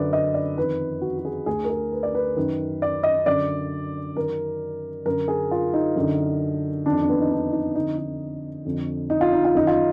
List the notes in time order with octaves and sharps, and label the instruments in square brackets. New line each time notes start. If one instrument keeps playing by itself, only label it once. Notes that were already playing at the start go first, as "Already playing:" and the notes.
Already playing: [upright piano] F#2 D3 B4 D5
D#5
D5
F2 D#3 B4
F#4
F#4
G#4
D2 D3 G#4
A#4
G#4
B4
D5
B4
F#2 D#3
D5
D#5
F#2 D3 D5
F#2 D#3 A#4
F#2 D3 A#4
G#4
F4
D#4
F#2 D3
F2 D#3 D4
D4
B3
D#4
D4
D#4
F2 D3 D#4
D#4
F2 D3
D#4
F4
D#4
F4
F#2 D#3 D#4
F4